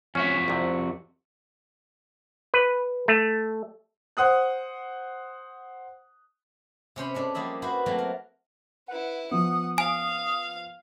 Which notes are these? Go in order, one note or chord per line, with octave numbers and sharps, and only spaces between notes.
F2 C#4 F#4 E5
C2 C3
B4
A3
C5 F#5 D#6 F#6
C3 C#4 C5 B5
G#3 C#4 D4 A4
F3 G3 A#3 G#4 E5 B5
E4 F#4 B4 C5
F#3 A3 A#3 C4
A#4
E4 B4 F#5
F3 B3 F#5 D#6
F5 G#5